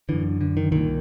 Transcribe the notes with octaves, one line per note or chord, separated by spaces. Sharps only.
F#2 D3 E3
D3
D#3
C2 A#2 D#3